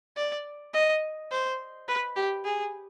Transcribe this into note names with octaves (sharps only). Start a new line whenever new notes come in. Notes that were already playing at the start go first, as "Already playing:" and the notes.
D5
D#5
C5
B4
G4
G#4